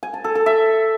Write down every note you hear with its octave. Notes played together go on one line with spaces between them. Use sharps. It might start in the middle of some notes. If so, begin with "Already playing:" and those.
G#5
A5
A4
A4
E5